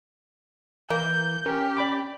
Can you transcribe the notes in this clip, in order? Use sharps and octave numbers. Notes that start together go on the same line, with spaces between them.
E3 A#3 G6
C#4 G4 A#4
D5 B5 D6